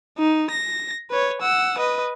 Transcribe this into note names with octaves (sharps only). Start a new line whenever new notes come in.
D#4
A#6
B4 C#5
F#5 E6
B4 D#5